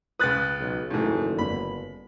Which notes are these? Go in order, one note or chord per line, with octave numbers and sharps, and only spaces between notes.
C#2 B4 D#6 F#6 A6
B1
F#1 D#2 G#2 D#3 E3 A3
G1 B5